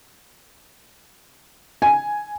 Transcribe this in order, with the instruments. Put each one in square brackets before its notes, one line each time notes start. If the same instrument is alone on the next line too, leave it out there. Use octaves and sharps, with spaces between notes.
[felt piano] G#5